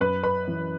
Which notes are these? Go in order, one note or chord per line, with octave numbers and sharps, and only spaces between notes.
F#2 B4 B5
B4 B5
E3